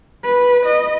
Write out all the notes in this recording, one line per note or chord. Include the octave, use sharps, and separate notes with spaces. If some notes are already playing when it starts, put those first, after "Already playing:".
B4
D#5